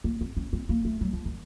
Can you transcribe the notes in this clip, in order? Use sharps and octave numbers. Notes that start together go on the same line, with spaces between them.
A#3
C4
C#4
C4
A#3
A3
F#3
F3
D#3